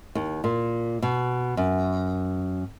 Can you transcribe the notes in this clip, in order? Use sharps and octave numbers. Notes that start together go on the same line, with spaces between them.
D#2
A#2
B2
F#2